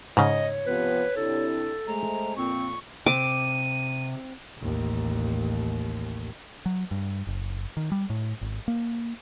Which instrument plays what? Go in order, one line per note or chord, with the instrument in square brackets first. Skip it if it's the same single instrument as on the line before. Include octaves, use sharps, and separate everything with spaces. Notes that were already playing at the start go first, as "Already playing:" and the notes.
[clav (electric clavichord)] G#2 C#3 [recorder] C#5 [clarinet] D#5
[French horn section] C3 F3 B3 [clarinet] B4
[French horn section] C3 D4 E4 [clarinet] A4
[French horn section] G#3 A3 C5 [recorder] A#5
[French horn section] F2 A#2 [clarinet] C4 [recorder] C#6
[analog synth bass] C3 [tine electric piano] C4 [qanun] D6 [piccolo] D#7
[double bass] A1 D#2
[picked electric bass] F#3
G2
F#1
D#3
G3
A2
G#1
A#3